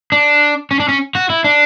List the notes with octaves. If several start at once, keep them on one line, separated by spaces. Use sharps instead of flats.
D4
C#4
D4
C#4
F#4
E4
D4